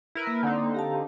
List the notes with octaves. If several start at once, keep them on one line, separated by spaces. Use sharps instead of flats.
E4 A#4 B4
A#3
D3 C4 D#4
G4 F5 A5